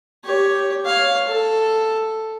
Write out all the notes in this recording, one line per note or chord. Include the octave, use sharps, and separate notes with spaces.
G4 C#5
C#5 F5
A4